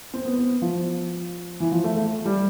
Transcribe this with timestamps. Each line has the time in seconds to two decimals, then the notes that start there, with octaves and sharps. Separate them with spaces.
0.14 C4
0.25 B3
0.38 B3
0.62 F3
1.60 E3
1.72 F3
1.84 A3
1.96 A3
2.26 G3